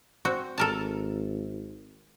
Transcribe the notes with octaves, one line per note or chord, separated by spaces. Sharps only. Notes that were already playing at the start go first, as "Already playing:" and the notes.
C4 F#4
G#1 A4 A#4 A5